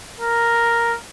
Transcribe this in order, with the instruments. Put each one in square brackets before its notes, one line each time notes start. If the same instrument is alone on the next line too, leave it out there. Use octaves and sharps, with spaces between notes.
[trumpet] A#4